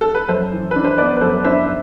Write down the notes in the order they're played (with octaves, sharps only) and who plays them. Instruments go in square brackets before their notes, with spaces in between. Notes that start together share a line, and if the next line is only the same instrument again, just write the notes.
[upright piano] A4
B4
F#2 A4 C5
E3
D4 B4
C5
B3 B4 D5
B4
F#2 A4 C5
D4 C5 E5
E5